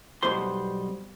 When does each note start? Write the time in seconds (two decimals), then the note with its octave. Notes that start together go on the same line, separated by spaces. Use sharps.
0.23 B1 B2 G3 C5 C6